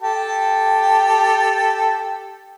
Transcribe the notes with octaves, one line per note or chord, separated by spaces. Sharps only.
G4 A4